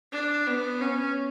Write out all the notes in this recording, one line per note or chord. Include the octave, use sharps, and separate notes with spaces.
D4
B3
C#4